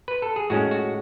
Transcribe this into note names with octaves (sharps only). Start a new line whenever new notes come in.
B4
A4
G#4
A2 G#3 C#4 F#4
F#4